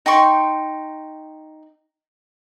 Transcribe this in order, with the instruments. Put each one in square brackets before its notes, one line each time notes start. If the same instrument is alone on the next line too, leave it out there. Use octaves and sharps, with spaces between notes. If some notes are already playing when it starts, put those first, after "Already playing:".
[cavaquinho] D#4 G5 C6 C#6